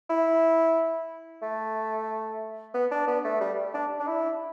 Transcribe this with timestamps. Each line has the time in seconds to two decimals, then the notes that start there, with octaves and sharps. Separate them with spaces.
0.10 E4
1.42 A3
2.74 B3
2.91 D4
3.08 B3
3.24 A3
3.41 G3
3.74 D4
4.00 D4
4.07 E4